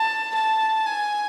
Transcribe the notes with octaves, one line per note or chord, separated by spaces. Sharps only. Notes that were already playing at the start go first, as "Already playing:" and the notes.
Already playing: A5
A5
G#5